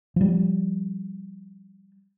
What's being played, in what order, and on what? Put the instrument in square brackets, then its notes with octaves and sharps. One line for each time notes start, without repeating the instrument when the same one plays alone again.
[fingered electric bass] F3 G3